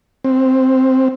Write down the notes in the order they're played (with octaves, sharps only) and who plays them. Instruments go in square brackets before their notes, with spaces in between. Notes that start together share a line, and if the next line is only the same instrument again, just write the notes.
[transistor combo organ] C4